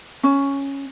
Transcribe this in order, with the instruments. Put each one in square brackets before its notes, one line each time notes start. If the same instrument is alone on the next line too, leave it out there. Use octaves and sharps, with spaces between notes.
[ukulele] C#4